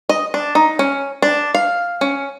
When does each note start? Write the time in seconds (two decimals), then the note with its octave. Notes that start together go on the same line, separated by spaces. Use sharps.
0.09 D#5
0.34 D4
0.55 D#4
0.79 C#4
1.22 D4
1.55 F5
2.01 C#4